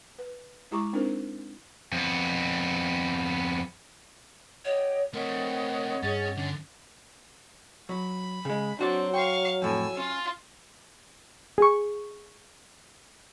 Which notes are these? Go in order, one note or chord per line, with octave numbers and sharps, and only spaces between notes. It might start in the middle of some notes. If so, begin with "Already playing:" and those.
B4
G#3 E4 G4 A#5 C#6 D6
C4 D4 D#4 F4 A#4 C5
F2 B3
G4 C#5 D#5 F#5
A3 C4 A#4 C#5 D#5 F#5
G2 C#4 G#4 A6
D3 C#4
F#3 B5
C#3 G#3
F#3 C4 D4 F#4 D5
F5 G5 C#6
F2 A2 G#5 E6
C#4 F4
G#4 C#6